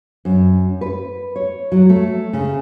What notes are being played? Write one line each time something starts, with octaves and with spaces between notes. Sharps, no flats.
F#2
B4
C#5
F#3
A3
C#3